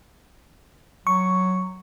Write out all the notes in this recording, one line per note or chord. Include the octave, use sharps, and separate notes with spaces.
F#3 C#6